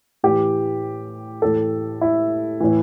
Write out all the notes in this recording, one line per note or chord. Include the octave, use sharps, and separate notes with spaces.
A2 E3 G4
A2 E3 A4
E4
A2 E3